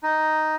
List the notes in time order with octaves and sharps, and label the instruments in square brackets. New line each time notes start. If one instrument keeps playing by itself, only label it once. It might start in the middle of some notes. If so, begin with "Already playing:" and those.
[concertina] D#4